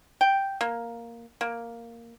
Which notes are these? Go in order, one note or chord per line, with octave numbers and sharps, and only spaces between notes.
G5
A#3
A#3